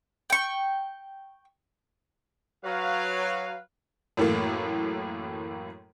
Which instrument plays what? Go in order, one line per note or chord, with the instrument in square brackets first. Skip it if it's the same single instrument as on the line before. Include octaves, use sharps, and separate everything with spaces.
[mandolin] G5 C#6
[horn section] F#3 B4 F5
[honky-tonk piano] F#2 A2 E3 A3 A#3